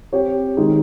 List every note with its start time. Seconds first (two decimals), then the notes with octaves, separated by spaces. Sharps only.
0.13 C4 G4 C#5
0.57 D#3 G#3 D#4